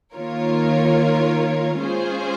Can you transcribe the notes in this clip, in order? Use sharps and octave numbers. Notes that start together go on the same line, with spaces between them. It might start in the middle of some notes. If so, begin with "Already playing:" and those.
D#3 A#3 F4 A#4 C#5
G#3 C#4 F4 G#4 C5